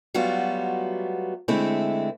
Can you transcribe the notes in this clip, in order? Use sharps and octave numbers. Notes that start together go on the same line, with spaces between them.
F#3 G3 A3 B3 F4 F#4
D3 G#3 A3 C4 E4